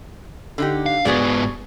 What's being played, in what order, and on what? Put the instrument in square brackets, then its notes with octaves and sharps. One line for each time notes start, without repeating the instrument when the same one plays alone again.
[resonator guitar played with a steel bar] D3 D#4 G4
[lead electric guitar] F5
[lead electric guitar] G#2 B3 [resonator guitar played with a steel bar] F#4 G#4 D5